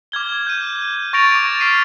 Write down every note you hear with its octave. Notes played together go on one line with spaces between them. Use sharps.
D6 F6 G#6 G7
G6 D#7
C#6 A6 A#6 D7 F7
D6
D6 F6 B6 C7 D7 D#7